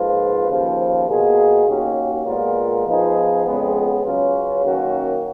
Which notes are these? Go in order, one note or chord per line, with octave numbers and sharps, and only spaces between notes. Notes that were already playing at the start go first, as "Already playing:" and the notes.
Already playing: G#2 F3 A#3 F4 B4
D#2 C#3 F3
B2 A#3 F4 G#4
D#2 D#3 A#3 C#4 F#4
A#2 G#3 B3 F4 A#4
F3 B3 D#4 G#4
F2 C#3 G#3 B3
C#3 F#3 C#4 F4 B4
F#2 D#3 A#3 C#4 F#4